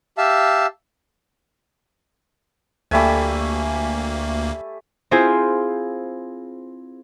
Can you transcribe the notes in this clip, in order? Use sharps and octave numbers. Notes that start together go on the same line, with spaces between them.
G4 E5 F5 A5 E6
D2 G3 A3 A#3 G#5
C4 E4 F4 G#4 C5 G#5